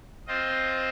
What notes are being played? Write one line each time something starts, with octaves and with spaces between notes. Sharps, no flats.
C4 F4 C5 D#5